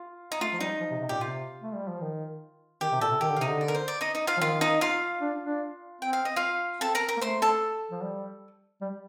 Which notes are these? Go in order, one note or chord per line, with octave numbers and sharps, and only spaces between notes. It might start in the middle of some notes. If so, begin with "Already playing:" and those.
Already playing: F4
D#4
A3 F4
F3
G3 D#4
F3
C3
C3
A#2 G4
C3 F4
A3
G3
F3
D#3
D#3 G4
C3
A#2 A4
C3
D#3 G4
D3
F5
C3 D#4 D#5
D3
D5
A#4
C5
D5
D#4 D#5
D#4 D#5
F4 F5
F3
D#3 F4 F5
D#4 D#5
F4 F5
D4
D4
C4 G5
F5
D#5
F4 F5
C4 A4 A5
A#4 A#5
A#4 A#5
A#3
A3 C5 C6
A4 A5
F3
G3
G3